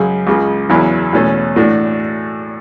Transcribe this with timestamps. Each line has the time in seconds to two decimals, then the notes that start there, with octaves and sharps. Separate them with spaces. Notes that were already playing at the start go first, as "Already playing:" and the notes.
Already playing: F#2 C#3 G#3
0.27 C#2 C#3 G#3
0.69 E2 C#3 F#3 B3 E4
1.13 E2 B2 A3 C#4
1.56 A2 E3 A3 D4 F#4